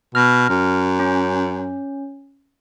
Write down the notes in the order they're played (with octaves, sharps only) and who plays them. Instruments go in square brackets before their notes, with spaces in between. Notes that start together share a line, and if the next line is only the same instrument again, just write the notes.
[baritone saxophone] B2 [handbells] F6 A#6
[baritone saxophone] F#2
[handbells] C#4